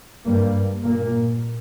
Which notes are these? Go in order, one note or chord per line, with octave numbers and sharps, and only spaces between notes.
G2 G3 A#3
A#2 A#3